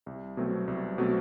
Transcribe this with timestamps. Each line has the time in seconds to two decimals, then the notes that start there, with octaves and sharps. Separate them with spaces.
0.06 C2
0.37 B2 F#3 A3 C4
0.68 C2
0.98 B2 F#3 A3 C4